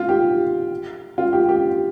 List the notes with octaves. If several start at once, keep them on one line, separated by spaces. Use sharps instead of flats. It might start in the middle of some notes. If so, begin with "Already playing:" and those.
Already playing: F4
G4
F4
G4
G4